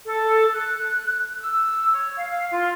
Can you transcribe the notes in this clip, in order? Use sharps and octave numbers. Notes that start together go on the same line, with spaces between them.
A4
F#6
E6
C#5
F5
F4